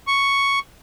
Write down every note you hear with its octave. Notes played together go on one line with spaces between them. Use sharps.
C#6